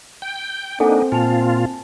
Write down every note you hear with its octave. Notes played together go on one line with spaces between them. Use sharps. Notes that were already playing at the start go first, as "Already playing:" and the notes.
G5
A#3 C4 D4 D#4 A4 F#5 G#5
A#2 F4 G#5 A5 F7